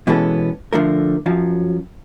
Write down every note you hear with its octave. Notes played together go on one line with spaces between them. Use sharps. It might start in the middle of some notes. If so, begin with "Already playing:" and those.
B2 E3 G#3 B3 C#4 A4
D3 F3 A3 A#4
F#2 F3 F#3